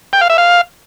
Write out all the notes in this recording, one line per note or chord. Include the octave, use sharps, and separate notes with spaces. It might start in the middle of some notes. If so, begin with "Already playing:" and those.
G5
F5
E5
F5